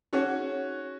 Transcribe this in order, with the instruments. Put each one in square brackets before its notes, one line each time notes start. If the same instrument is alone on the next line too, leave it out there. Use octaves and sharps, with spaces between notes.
[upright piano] C#4 F#4 [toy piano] D#4 G#4 C#5 F#5